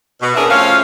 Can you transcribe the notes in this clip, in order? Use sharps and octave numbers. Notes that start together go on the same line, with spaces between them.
B2
C#4 D4 E4 F#4 G#4 A#4
F3 A3 C4 C#4 F5